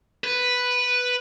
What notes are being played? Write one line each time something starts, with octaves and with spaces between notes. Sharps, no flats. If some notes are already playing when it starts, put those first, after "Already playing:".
B4